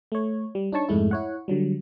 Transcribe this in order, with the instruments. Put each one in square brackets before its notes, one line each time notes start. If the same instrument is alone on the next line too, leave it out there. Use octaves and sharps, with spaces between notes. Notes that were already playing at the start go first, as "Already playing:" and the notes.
[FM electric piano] A3 C#5
G3
D4 D#4 C#5 A5 C#6
F2 G#2 G#3 A3 E4
E4 C#5 F#5
D3 F#3 G3